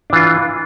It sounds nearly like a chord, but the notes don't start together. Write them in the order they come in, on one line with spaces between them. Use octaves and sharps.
D4 E3 F4